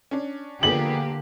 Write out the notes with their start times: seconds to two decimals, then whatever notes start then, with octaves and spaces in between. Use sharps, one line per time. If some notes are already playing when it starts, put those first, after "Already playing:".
0.11 C#4 D4
0.63 D3 F3 A#3 B3 G4 G#4 F#7